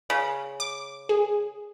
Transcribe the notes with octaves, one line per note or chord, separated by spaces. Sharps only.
C#3
D6
G#4